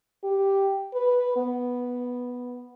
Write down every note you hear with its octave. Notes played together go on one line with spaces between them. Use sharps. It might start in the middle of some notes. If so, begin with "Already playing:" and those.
G4
B4
B3